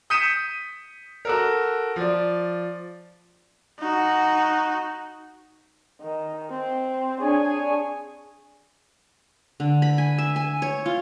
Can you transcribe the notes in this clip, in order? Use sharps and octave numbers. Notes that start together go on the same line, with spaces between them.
D#6 G6 B6 C#7 D#7 E7
F#4 A4 A#4
F3 D5
D#4 F#4
D#3
C4
D4 G#4 C#5 G#5
D3
B5
G#5
E5
G#5
C#5
F4